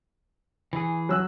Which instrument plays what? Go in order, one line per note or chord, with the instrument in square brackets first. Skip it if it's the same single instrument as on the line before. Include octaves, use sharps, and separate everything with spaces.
[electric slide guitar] E3 G#4
[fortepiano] F#3 E6 F#6